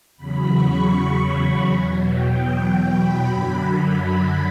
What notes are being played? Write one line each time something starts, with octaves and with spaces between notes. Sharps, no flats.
E2 C#3 F#3 B5
C#6
B5
E2 B2 F#3
G5
B5
F#2 D3 F#3
B5